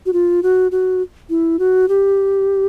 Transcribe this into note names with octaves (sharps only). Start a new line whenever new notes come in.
F#4
F4
F#4
F#4
E4
F#4
G4